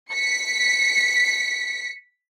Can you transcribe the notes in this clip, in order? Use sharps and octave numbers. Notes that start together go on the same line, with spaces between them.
B6 C#7